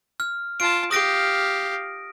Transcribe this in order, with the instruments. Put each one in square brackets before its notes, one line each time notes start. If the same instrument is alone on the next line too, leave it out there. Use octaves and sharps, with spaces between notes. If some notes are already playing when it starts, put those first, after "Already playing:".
[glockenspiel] F6
[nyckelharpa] F4 A5 [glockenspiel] D7
[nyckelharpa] G4 F5 [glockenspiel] D#6 A#6 D7